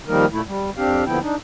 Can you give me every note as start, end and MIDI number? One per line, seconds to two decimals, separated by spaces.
0.07 0.26 51
0.07 0.26 53
0.07 0.26 55
0.07 0.26 58
0.07 0.26 63
0.07 0.26 70
0.32 0.41 46
0.32 0.41 57
0.32 0.41 64
0.47 0.70 55
0.77 1.04 41
0.77 1.04 60
0.77 1.04 62
0.77 1.04 67
0.77 1.04 77
1.06 1.19 39
1.06 1.19 50
1.06 1.19 53
1.06 1.19 59
1.06 1.19 64
1.06 1.19 79
1.21 1.36 62
1.21 1.36 63